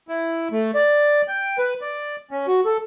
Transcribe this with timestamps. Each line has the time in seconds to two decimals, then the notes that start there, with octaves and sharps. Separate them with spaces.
0.08 E4
0.52 A3
0.75 D5
1.28 G5
1.58 B4
1.81 D5
2.31 C#4
2.48 F#4
2.66 A4